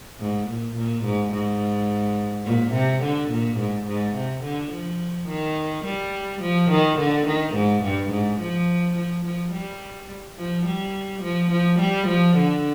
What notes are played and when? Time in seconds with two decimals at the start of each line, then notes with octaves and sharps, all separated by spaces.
0.20 G#2
0.49 A#2
0.77 A#2
1.05 G#2
1.33 G#2
2.46 A#2
2.74 C3
3.03 D3
3.31 A#2
3.59 G#2
3.87 G#2
4.16 C3
4.44 D3
4.72 F3
5.29 D#3
5.85 G3
6.42 F3
6.71 D#3
6.99 D3
7.27 D#3
7.55 G#2
7.84 G2
8.11 G#2
8.41 F3
8.96 F3
9.25 F3
9.53 G3
10.38 F3
10.66 G3
11.23 F3
11.51 F3
11.80 G3
12.08 F3
12.37 D3